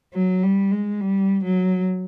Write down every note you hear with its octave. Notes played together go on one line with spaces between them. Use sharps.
F#3
G3
G#3
G3
F#3